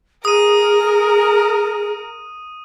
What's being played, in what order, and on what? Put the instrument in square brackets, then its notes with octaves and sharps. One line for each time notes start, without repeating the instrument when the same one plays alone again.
[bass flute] G#4 [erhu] A#4 [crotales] D#6 D#7